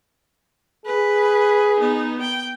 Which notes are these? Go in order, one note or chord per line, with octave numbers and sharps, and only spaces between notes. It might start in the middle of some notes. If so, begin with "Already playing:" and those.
G#4 B4
B3 D#4
G5